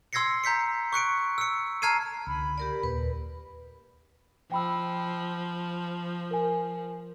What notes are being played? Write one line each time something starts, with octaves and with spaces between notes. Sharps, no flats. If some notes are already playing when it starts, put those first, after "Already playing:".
C6 E6 G#6 A#6 C7 C#7
A#5 G6 B6 C#7
C#6 F#6 C#7 D7
E6 C#7
A5 A#5 F6 G#6 C7 D#7
C#2 D3 B5
G4 A#4 D5
D#2 A#2 B4
F3 G5 B5 E6
A#4 G#5